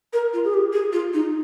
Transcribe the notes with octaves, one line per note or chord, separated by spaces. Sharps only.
A#4
F4
G#4
G4
G#4
F4
D#4